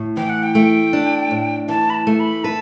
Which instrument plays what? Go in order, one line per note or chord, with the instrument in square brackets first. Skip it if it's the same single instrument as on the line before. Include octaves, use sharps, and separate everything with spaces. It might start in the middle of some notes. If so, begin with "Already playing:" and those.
Already playing: [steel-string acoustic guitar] A2
[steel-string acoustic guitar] E3 [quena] G5
[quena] F#5
G5
[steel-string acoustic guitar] A3
D4
A2
[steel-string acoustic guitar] E3 [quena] A5
[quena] B5
A5
[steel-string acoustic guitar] A3
[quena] B5
[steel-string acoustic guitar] B4 [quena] A5